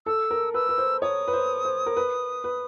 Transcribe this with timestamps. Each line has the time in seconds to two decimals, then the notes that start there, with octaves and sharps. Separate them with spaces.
0.06 A4 E6
0.31 A#4
0.54 B4 E6
0.69 B4
0.78 C5
1.02 C#5 D#6
1.28 B4
1.33 C5
1.65 C5
1.86 A#4
1.97 B4
2.44 B4